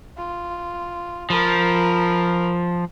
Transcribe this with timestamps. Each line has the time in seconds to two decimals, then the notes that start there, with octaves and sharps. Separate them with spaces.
0.17 F4
1.30 F3 A#4 B5